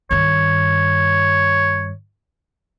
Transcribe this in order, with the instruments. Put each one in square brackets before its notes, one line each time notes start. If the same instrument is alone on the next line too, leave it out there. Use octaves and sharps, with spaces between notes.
[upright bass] G2 D#3 [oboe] C#5